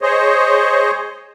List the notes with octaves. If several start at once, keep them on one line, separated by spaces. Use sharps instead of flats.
G#4 C5 C#5 D#5